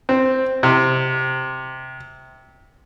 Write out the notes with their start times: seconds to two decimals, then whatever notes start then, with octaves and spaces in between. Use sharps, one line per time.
0.09 C4
0.63 C3